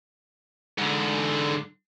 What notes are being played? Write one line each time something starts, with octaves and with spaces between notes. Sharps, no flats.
G#2 D3